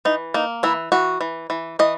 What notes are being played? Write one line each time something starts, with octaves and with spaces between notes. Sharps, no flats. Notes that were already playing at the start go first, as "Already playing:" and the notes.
E3 D#4
A#3 D#4
E3 E4
E3 F#4
E3
E3
E3 D#5